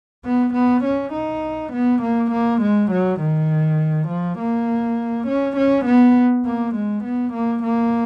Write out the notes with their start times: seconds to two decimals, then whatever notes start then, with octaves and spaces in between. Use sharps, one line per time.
0.25 B3
0.54 B3
0.84 C#4
1.13 D#4
1.73 B3
2.03 A#3
2.31 A#3
2.62 G#3
2.91 F#3
3.20 D#3
4.08 F3
4.39 A#3
5.27 C#4
5.57 C#4
5.86 B3
6.46 A#3
6.75 G#3
7.04 B3
7.33 A#3
7.63 A#3